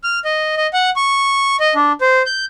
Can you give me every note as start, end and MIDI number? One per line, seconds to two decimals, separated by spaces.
0.04 0.19 89
0.25 0.55 75
0.57 0.67 75
0.73 0.90 78
0.96 1.56 85
1.60 1.74 75
1.75 1.92 62
2.01 2.22 72
2.26 2.45 91